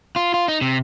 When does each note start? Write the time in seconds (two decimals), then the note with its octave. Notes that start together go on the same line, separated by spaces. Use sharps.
0.16 F4
0.34 F4
0.48 D#4
0.61 C3